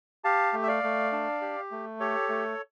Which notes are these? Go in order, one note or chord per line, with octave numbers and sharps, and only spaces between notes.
G4 F5 A5
A3
E5
D5 F5
A3
D4
G4
A3
G4 A4 C#5
A3